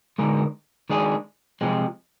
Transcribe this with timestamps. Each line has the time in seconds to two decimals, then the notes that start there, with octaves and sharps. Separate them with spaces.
0.18 D3 G#3 D#4 A#4
0.90 D#3 G#3 D4 G#4
1.61 C3 F3 G#3 C4